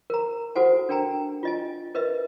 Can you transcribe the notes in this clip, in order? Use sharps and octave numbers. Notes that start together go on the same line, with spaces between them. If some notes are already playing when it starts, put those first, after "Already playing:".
A#4 A#5
F#4 A4 C5 F#5 G#5
D4 A#4 G5 G#5 A#5
F4 D#5 G#5
A#4 B4 D#5 E5